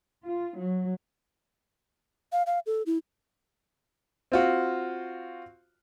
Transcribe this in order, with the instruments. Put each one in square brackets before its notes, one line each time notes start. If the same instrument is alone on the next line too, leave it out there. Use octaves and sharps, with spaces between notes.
[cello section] F4
F#3
[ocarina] F5
F5
A4
E4
[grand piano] C4 F4 F#4